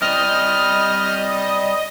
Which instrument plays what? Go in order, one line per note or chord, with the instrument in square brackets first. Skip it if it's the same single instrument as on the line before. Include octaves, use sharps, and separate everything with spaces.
[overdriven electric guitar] G3 C4 [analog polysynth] D#5 [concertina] F6